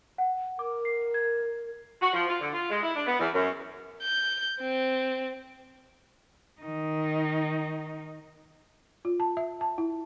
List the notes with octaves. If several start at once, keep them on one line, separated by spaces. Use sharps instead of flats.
F#5
A#4 D6
C7
G#6
F#4
F3
F4
D3
F4
G#3
E4
D4
B3
E2
F#2
G6
C4
D#3 D#4
F4
A5
E5
A5
E4